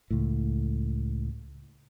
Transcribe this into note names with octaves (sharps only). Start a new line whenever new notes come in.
C#2 A2